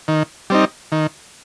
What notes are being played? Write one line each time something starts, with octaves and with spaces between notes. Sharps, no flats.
D#3
G3 C4 D#4
D#3